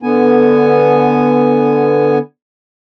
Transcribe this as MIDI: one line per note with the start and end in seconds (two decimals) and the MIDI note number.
0.03 2.18 50
0.03 2.18 59
0.03 2.18 80